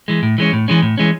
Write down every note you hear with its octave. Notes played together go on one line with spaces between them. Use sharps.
E3 G#3
A2
E3 G#3 C#4
A2
E3 G#3 C#4
A2
E3 G#3 C#4